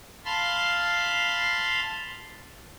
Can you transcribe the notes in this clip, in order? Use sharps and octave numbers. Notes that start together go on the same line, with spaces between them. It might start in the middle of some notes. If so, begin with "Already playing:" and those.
F5 A5 B5 C6 F6